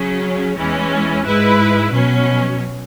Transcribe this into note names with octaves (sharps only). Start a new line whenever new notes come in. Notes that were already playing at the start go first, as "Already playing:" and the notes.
Already playing: C#3 F#3 C#4
E2 E3 G#3 C#4
G#2 G#3 E4 B4
B2 F#3 C#4